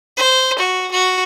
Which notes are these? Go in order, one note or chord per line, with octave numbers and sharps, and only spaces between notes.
C5
F#4
F#4